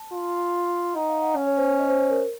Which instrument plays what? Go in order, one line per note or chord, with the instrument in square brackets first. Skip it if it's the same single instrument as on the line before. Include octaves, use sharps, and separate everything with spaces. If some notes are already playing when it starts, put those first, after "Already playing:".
Already playing: [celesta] A5
[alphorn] F4
[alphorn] D#4 [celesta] F#5
[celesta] F5
F#5
[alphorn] C#4
[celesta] C#5
C5
C#5
D#5
C5
C5
A#4